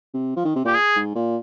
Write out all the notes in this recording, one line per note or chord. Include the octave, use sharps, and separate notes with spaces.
C3
F3
D#3
C3
A#2 G4
G#4
G#2
A#2